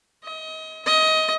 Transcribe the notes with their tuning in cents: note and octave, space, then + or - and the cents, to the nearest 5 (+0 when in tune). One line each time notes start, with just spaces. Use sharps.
D#5 +30
D#5 +20